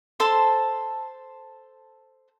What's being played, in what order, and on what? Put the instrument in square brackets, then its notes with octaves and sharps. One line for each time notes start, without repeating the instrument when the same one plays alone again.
[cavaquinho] A4 C5 A5 C6